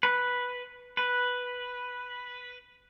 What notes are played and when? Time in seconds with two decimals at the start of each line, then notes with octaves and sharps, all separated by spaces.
0.03 B4
0.97 B4